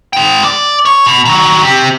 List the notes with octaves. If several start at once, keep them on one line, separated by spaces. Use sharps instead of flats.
G#3 G5
D5
C#5
B2
D#3 F#3
C4 G4